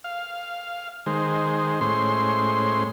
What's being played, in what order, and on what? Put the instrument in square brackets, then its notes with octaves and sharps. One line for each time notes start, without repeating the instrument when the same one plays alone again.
[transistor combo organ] F5
D#3 G#3 C5
A2 G#3 C#4 C5 C6